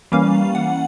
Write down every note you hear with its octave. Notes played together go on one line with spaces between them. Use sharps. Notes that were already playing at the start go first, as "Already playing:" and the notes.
E3 G3 A#3 C#4 F5
F#5